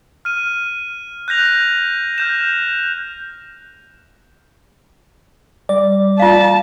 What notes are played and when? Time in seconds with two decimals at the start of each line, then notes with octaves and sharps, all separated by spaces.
0.25 F6 D#7
1.28 F#6 G6 A#6 F7
2.18 F6 G6 E7
5.69 G3 D5
6.20 F4 F5 A5